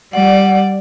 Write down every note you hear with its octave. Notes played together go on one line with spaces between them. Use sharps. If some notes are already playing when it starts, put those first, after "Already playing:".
G3 D5 F#5